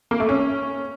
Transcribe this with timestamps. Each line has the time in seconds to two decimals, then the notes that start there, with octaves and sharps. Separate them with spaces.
0.11 A#3
0.20 A3
0.29 C#4